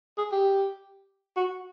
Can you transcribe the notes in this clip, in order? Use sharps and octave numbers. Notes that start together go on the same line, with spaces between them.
G#4
G4
F#4